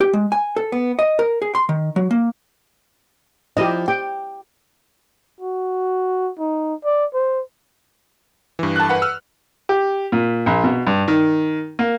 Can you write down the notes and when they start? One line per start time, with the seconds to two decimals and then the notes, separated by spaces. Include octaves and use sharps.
0.01 G4
0.13 G#3
0.32 G#5
0.56 A4
0.72 B3
0.99 D#5
1.19 A#4
1.42 G#4
1.55 C6
1.69 D#3
1.96 F#3
2.11 A#3
3.57 F3 E4 G4 D#5
3.88 G4 G5
5.41 F#4
6.39 D#4
6.85 D5
7.14 C5
8.59 G2 E3
8.76 A5 F#6
8.89 B4 F#5
9.02 E6 F6
9.69 G4
10.12 A#2
10.46 A#1
10.64 B2
10.87 G2
11.08 D#3
11.79 A#3